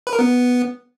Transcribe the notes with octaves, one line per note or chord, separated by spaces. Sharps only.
B4
A#4
B3